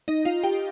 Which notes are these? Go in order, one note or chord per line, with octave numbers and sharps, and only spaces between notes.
D#4 D#5
F4 F5
G4 G5